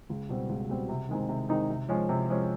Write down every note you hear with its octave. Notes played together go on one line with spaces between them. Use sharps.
C#2
B2 G3 C4
C#2
B2 G3 C4
C3
D#3 G#3 C4 D#4
C3
D#3 G#3 C4 D#4
C3
F3 G#3 C#4
C3
F3 G#3 C#4